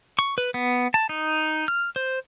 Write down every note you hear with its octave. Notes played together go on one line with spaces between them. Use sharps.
C#6
B4
B3
A5
D#4
F6
C5